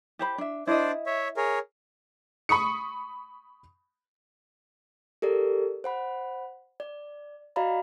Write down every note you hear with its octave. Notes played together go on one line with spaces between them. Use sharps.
G4 C5 B5
D4 E5
D4 E4 C5 D5 D#5
C#5 E5
G#4 A#4 C#5
B5 C#6 D#6 C#7
G4 A4 A#4 D5
C5 F#5 B5
D5
F#4 D5 D#5 F5 A#5 B5